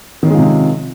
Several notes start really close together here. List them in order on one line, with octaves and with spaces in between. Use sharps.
D#3 C#4 G#3 F3 C3